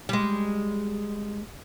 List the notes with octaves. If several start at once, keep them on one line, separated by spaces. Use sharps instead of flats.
G3 G#3